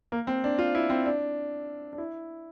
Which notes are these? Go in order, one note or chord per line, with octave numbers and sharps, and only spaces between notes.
A#3
C4
D4
F4
E4
C4
D4
D4
E4